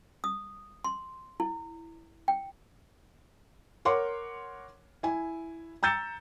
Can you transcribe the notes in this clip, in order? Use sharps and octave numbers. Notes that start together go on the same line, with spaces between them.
D#6
C6
E4
G5
A#4 C#5 F#5 C6 D6
E4 G#5
A#5 E6 G6 A6 C#7 E7